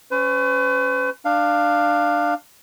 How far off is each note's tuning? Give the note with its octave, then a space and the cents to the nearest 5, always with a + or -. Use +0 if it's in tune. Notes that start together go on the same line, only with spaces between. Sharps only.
C#4 +0 B4 +45
D4 +20 F5 +0